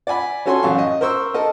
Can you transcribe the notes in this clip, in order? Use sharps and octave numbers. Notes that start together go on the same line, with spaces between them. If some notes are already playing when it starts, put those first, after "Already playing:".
D5 F#5 G#5 B5
C#4 F#4 A4 C#5 G#5 C6
A1 F#2 F5 C#6
D#5
A#4 C5 C#6 E6
A4 A#4 D#5